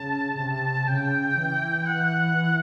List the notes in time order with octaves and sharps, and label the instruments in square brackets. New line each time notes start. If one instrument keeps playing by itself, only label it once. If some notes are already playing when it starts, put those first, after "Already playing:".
Already playing: [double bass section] C#3 [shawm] A5
[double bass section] C3
[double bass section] C#3 [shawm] G5
[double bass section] E3
[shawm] F#5